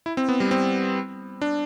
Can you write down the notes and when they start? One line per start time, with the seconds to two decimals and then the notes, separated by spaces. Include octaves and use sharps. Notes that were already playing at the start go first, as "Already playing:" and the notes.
0.06 E4
0.17 C4
0.29 B3
0.40 G3
0.51 C4
1.41 D4